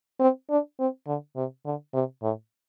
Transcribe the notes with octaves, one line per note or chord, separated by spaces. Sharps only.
C4
D4
C4
D3
C3
D3
C3
A2